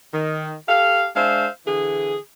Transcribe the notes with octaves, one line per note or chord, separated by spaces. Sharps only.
D#3
G4 A4 F5
G#3 D4 C5 E5 F5
D3 E3 G#4